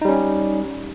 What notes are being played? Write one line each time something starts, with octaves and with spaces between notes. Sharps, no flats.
G3 C#4 D#4